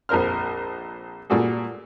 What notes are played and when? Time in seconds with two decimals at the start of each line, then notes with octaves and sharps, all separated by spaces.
0.09 A#1 F2 A#4 C5 F6
1.30 A#2 G3 F#4 G#4 A4